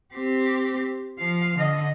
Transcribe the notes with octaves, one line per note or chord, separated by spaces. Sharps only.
C4 G4
F3 F5
D3 D#5